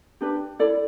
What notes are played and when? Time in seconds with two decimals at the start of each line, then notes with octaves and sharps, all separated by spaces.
0.21 D4 G4 B4
0.59 E4 A4 D5